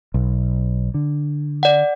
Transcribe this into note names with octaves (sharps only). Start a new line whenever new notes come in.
B1
D3
D5 F#5